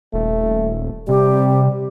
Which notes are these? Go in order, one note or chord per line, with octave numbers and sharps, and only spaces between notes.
D#1 A3
C3 G3 G4